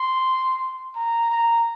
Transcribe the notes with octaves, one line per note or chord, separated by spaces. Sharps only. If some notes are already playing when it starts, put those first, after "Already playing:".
Already playing: C6
A#5
A#5